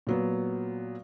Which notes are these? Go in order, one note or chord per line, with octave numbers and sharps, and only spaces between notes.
A#2 F#3 B3